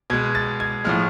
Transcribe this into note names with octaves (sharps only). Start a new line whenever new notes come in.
B2 G#3 G#6
A6
G#6
A2 F3 G#3 F6